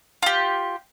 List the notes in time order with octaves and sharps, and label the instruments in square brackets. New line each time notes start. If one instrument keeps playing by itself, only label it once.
[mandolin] F4 G4